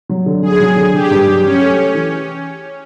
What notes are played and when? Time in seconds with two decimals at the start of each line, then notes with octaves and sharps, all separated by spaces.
0.09 F#3
0.26 D3
0.42 F#3 G#4
0.60 F#3
0.76 D3
0.93 D3 G4
1.11 G2
1.27 F#3
1.44 F#3 C#4
1.61 A3
1.77 A3
1.94 E3